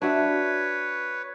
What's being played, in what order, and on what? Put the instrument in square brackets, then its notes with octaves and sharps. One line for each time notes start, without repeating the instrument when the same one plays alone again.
[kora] D4 F#4 E5 [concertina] B4 C#5